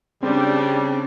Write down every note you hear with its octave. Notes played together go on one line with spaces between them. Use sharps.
C#3 G3 C4 D4